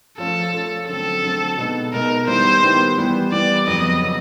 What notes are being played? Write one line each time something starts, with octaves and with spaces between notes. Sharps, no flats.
F3 A3 C#4 F4 A4
F3 A3 C#4 F4
D3 F#3 A3 C4 A4
D3 F#3 A3 C4
B2 G#3 B3 D#4
B2 G#3 B3 D#4 A#4
D#3 G3 B3 E4 G4 C5
D#3 G3 B3 E4 G4
E3 G3 B3
E3 G3 B3 D5
F2 C#3 F#3 B3 D#5
C#3 F#3 B3